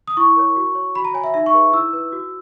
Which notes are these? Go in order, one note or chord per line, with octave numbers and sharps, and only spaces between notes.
D#6
E4 C#6
A#4 C#5
F#4
C#5
F#4 B5
A#5
C#5 G#5
E5
D#4 E5
C#6
G#4 B4
E4 E6
B4
F#4